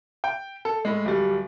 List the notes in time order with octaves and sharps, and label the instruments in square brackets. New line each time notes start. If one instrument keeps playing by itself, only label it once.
[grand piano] G5
A4
A2 G#3
D1 G3